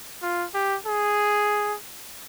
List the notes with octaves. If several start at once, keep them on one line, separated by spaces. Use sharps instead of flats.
F4
G4
G#4